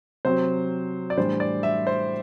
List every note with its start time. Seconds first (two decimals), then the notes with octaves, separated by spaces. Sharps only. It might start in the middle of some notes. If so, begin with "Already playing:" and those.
0.25 C3 F#3 C4 C5
1.10 D5
1.17 A2 E3 G3 D4 C5
1.40 D5
1.63 E5
1.87 C5